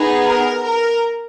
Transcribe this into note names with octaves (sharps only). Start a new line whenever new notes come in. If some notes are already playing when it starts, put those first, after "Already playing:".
Already playing: B3 D#4 G#4
A#4
A#4